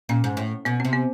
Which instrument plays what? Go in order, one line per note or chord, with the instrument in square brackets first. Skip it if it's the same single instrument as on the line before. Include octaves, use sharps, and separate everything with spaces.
[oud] A#2 [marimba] C#4
[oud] G#2
A2
[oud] B2 [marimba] B3
[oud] C3 [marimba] C4
[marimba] B3